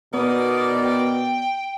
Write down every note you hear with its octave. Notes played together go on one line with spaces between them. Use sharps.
B2 B3 D#4 A#4 D5 D#6
G5